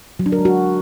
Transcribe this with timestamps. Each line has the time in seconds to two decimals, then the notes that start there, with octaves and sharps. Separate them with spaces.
0.19 F#3
0.26 D4
0.32 A#4
0.39 G#3
0.45 F#4